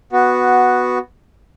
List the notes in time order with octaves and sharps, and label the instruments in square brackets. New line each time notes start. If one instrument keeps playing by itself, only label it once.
[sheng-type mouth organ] B3 F#4